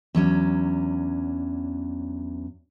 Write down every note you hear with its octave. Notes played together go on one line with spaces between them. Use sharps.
E2 F#3 C#4 D4